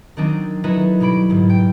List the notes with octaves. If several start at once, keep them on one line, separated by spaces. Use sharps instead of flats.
D#3 F#3 C4 D4 D#4
F#3 A3 D#4 E4 B4 D#5
B2 F#3 G3 B5 D7
G1 G#2
G5